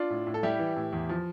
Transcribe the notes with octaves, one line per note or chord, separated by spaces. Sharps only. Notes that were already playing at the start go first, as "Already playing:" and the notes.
Already playing: D4 F4
A2
A2
A4
G3 E4 G4
E3
A2
E2
F3